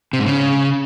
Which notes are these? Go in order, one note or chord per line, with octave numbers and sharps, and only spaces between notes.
C3
G#2
C#3